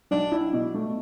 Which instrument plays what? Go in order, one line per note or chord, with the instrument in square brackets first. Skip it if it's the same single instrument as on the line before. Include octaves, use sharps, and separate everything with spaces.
[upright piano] B1 [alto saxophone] D4
[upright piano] E4
B2
A3